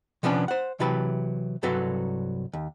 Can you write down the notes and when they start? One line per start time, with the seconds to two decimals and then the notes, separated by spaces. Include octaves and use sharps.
0.23 C3 F3 B3 C#4 D4
0.48 C5 F#5
0.80 C3 E3 F#3 G4 B4 A5
1.63 C2 G2 F#3 F#4 A4 B4
2.53 D#2